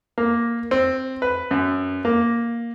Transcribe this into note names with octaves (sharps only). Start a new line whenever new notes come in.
A#3
C4
B4
F#2
A#3